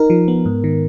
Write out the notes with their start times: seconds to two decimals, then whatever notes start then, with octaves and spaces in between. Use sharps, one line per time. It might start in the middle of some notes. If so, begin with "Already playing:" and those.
Already playing: D#4 A#4
0.10 F3
0.28 B3
0.45 G#2
0.64 D#3